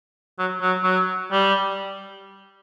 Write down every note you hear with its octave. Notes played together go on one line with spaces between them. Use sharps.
F#3
F#3
F#3
G3